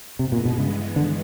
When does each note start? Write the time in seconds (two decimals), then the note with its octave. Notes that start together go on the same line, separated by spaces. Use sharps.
0.19 G2 C3 E3 G#3 B3
0.32 A#2
0.45 B2
0.58 C#3
0.96 D3